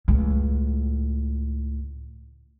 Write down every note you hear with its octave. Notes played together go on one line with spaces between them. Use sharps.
C#2 A2